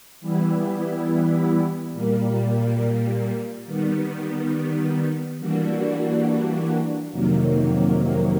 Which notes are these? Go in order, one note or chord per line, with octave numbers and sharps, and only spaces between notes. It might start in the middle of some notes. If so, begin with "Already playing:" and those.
E3 G3 B3 E4
A#2 G3 A#3
D#3 G3 B3
E3 G3 A#3 D4 F#4
F2 C3 D#3 F#3 A#3